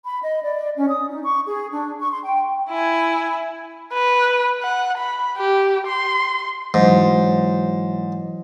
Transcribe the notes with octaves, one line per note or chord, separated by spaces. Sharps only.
B5
D#5
D5
C#4
D#6
D#4
C#6
G#4
D4
C#6
C6
G5
E4 G#5
B4
F#5
B5
G4
C6
G#2 E3 F#3